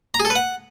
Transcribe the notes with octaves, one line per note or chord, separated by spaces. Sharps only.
A#5
G#4
A4
B4
F#5